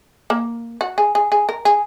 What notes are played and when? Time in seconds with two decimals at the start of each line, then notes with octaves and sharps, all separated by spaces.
0.30 A#3
0.81 F#4
0.98 G#4
1.15 G#4
1.32 G#4
1.49 A#4
1.65 G#4